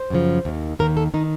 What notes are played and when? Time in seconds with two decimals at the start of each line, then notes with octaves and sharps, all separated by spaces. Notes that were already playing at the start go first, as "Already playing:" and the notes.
Already playing: C5
0.10 F#2 C#3 F3
0.45 D#2 D#3
0.79 D#2 D#3 A#4
0.97 A4
1.14 D#3 D#4